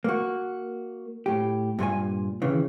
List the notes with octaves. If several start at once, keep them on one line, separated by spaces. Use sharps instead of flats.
A#3 F#4
A2 G4
G2 A#2 F4 G#5
D#2 C#3 E3